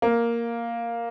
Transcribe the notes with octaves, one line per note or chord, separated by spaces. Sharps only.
A#3